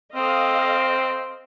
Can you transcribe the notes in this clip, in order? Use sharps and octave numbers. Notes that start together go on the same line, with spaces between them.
C4 A4 D#5 F5